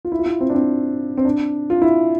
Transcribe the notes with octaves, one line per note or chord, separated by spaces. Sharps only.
F4
E4
F4
E4
C4
D4
C4
C4
D4
F4
E4